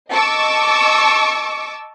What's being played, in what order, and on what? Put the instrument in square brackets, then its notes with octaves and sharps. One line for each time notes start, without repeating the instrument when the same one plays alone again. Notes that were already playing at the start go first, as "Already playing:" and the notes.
[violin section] D#5 A5 C#6 D6 E6